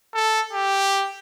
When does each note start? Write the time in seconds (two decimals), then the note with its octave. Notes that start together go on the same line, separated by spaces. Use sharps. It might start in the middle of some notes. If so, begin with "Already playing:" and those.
0.14 A4
0.53 G4